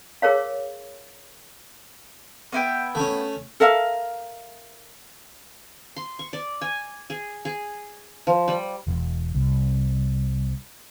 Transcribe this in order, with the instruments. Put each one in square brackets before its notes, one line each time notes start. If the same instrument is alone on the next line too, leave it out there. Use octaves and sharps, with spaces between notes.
[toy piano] G#4 A#4 C#5 F5
[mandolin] B3 E4 G5
[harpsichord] A3 C#4
[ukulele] A4 A#4 E5 F5
[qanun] C6
C#6
D5
G#5
G#4
G#4
F3
G3
[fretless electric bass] E1
C2